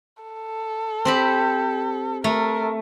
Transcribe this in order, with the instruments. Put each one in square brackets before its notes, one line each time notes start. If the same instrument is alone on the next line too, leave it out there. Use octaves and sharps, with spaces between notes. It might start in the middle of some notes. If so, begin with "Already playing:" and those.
[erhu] A4
[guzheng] C4 G4 B5
[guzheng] A3 [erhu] A#4